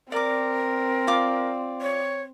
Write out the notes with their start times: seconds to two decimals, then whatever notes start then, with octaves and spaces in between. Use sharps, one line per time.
0.12 C4 A#4 D5 D6
1.07 F4 D5 D6
1.81 C#5